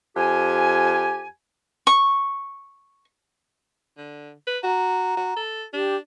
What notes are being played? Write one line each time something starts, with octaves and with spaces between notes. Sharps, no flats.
F2 G4 G#5
C#6
D3
B4
F#4 A#5
F#4
A4
D4 G4